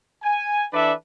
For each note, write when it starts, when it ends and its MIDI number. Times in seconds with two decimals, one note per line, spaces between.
0.23 0.65 80
0.73 0.93 52
0.73 0.93 62
0.73 0.93 69
0.73 0.93 71
0.73 0.93 74
0.73 0.93 76